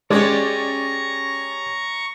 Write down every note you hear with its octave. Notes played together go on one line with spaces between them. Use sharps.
G#3 C#4 G4 C#5 D5 A#5 C#6